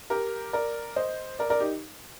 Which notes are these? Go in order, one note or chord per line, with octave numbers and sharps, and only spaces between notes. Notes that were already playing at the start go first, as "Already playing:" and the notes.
G4 A#4
A#4 D5
C5 D#5
A#4 D5
A#4 D5
D#4 G4